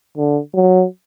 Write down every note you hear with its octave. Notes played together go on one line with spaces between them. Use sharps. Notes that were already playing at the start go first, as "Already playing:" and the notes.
D3
F#3